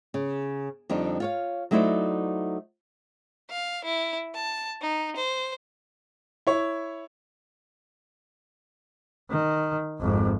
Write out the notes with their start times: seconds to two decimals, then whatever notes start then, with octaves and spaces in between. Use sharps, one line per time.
0.14 C#3
0.90 F2 D3 G3 D4 D#4
1.20 F4 C#5 F5
1.71 F#3 A3 D#4 E4 C5 D5
3.50 F5
3.84 E4
4.34 A5
4.82 D#4
5.16 C5
6.47 E4 C#5
9.30 D#3
10.00 G#1 F2